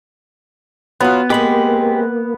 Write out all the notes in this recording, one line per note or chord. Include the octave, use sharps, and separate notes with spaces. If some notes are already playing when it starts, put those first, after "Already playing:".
F#3 B3 F4
G#3 A#3 C4 G4 B5